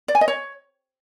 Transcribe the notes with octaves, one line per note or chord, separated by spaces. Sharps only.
D5
G#5
D#5
C#5